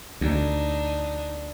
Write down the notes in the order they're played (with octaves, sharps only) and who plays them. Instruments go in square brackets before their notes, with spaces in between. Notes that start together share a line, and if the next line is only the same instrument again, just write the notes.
[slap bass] D2 [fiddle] D4 D#4